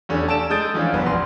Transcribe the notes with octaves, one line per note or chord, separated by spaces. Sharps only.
E2 A3 C#4 D4 G4 A4
A5 E6 D7 E7
G#3 A4 D#6 G6 A6 D7
E3 F3 C#4 D4 F4
G1 C2 B3
A#1 C6